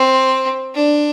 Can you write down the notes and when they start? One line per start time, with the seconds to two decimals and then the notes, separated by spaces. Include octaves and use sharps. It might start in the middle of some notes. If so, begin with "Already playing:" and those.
Already playing: C4
0.75 D4